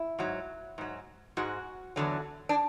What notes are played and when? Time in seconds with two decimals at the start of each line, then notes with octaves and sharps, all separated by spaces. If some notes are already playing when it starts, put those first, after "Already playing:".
Already playing: E4
0.19 G#2 F#3
0.78 G#2 F#3
1.37 G#2 G#3 F#4
1.96 E2 D3 F#3
2.49 D4